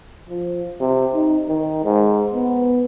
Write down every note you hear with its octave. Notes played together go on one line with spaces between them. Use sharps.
F3
C3
D#4
D#3
G#2
B3